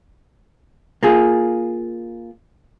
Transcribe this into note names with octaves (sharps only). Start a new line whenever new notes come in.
A#3 F4 G#4